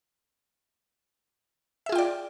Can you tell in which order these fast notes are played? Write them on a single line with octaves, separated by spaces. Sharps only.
E5 G#4 F4 G5 D5